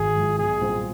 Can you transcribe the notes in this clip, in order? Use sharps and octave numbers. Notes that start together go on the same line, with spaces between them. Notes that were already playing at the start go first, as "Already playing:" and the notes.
Already playing: G#1 G#4
G#2 F3
B1 G#4
A#2 G3 C4